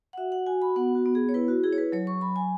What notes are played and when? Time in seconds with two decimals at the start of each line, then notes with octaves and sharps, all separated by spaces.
0.13 F#5
0.18 F#4 E5
0.32 F#5
0.47 F#4 G#5
0.62 B5
0.76 B3 F#5
0.95 F#4
1.06 B3
1.15 G#4
1.29 C#5
1.34 E4 B4
1.48 F#4
1.64 E4 G#4
1.73 C#5
1.78 B4
1.92 F#3 C#5
2.07 C#6
2.21 F#3 B5
2.36 G#5